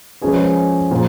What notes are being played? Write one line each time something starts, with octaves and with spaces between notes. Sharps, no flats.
F3 G#3 C#4 G#4 B4
A#2 F3